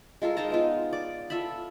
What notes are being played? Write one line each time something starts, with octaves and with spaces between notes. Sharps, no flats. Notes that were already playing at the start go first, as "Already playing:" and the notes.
G#3 F4 A4 A#4
G#3 D#4 A5 A#5
B3 D#4 F4
D5
F4 A4 E5 B5